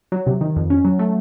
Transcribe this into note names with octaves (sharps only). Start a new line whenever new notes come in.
F#3
C3
D#3
F2
C#4
F#3
A3